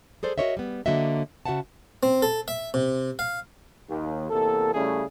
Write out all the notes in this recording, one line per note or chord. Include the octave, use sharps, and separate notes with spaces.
G#4 A4 C5 D5
F#4 G4 A#4 C#5 D#5 E5
G3 B3
D3 F#3 A#3 F#4 D#5 E5
C#3 F#4 C#5 E5 F#5 A5
C4
A4
E5
C3
F5
D#2
E2 C3 A#3 A4
C#3 G3 A3 C#4 E4 G#4